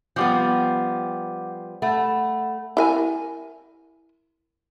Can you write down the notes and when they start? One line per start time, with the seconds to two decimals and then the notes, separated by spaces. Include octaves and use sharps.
0.16 F3 G3 B3 F#5 D6 G6
1.82 A3 F#5 B5
2.77 E4 A#4 G#5